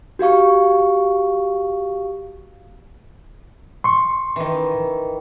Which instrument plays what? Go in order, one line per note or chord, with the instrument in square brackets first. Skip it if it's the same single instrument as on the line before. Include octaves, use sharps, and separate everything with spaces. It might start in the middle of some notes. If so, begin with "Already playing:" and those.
[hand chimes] F#4 G4 F5 C#6
[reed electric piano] C6 C#6
[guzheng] D#3 E3